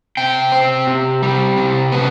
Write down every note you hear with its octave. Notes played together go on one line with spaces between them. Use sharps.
C3 G5
C4
C3
G3
C3
B3